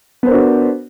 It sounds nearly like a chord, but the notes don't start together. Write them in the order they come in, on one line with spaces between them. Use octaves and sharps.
B3 C5 A#4 D4 F#4